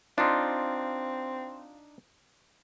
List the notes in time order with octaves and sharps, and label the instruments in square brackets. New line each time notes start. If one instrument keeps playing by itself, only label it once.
[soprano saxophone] C4 [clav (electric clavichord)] D4 D#4 [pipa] F4